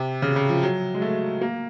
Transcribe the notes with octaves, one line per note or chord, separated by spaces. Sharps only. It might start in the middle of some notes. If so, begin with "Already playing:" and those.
Already playing: C3
C#3
C#3
F3
F#3
G#3
A3
A#3